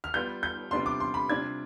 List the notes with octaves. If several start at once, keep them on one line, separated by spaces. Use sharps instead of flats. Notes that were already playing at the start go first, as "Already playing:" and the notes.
F6
G3 B3 F4 G6
G6
C3 G3 B3 D4 F4 C6
D6
C6
B5
C3 G3 D4 F4 G#6